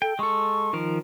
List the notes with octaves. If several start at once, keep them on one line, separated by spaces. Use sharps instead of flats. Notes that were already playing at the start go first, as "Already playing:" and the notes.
A4 G5
G#3 A4 C#6
D#3 F3 A#4